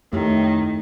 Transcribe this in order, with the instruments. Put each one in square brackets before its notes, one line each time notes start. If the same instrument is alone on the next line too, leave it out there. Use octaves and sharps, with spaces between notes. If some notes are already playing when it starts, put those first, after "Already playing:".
[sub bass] F2 [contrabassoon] A2 [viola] D#3 [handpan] A3 G4